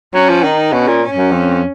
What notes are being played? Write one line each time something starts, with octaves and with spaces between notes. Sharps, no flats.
F#3 C#4
F3
D#3 D#4
B2 C#4
A#2
C#4
F#2
F2